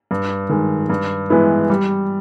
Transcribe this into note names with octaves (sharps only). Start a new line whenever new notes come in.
G2
D#3 G#3
G2
E3 G#3 B3 E4
G3